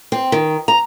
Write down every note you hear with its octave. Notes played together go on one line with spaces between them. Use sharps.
C4
D#3
A#5